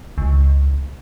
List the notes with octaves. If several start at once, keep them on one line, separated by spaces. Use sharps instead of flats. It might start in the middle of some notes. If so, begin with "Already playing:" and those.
C#2